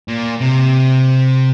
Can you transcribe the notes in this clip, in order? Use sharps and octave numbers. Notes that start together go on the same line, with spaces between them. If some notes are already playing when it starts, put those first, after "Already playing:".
A#2
C3